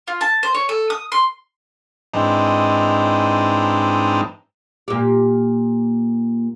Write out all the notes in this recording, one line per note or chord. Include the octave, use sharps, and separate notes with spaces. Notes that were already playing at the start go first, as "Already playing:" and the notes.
F4
A5
C5
C#5
A4
D#6
C6
G#2 E3 C4 D4 D#4
A#2 G4